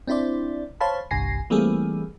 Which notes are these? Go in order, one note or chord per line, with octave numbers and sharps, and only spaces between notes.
C4 D4 E4 C5 D5
C5 C#5 F5 A5 B5
G1 C2 G#5 A#6 C7
E3 G3 A3 A#3 C4 G#4